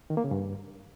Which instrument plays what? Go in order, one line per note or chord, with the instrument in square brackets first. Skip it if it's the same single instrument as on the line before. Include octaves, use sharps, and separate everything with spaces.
[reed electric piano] D#3
A#3
C#3
G2